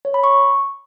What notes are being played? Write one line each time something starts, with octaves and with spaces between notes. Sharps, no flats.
C#5
B5
C#6